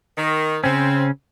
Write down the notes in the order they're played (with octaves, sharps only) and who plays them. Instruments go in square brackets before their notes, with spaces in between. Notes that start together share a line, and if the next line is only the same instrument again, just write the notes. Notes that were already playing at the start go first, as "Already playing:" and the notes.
[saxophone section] D#3
[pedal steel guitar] C#3 C#4 [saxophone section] C4